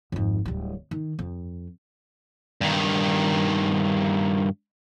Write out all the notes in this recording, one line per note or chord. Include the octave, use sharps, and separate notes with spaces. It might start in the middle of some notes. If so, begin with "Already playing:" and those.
G#1 F2
D1 G3
D#3
F2
G2 D#3